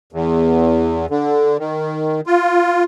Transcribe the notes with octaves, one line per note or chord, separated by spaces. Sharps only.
E2
D3
D#3
F4